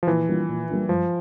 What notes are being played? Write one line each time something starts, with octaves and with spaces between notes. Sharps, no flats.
F3
A#2 E3
G3 A#3 D4 F4
A#2
G3 A#3 D4 F4
G2 F3